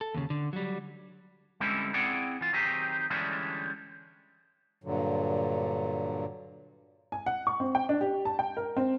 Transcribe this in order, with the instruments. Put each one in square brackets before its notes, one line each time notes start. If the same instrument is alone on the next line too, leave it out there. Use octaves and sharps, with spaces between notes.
[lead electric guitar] A4
D#2 C#3
D3
F#3 G3
[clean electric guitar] D3 G3 G#3 C4 C#4 E4
C4 E4 G#4 D5 F#5
E3 F4
D#3 F#3 C4 D#4 G4 G#4
D3 E3 G3 G#3 C#4 D4
[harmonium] G2 A#2 D3 F#3
[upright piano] G#5
F#5
C#6
C4
G5
D4
G4
A5
G5
A#4
C4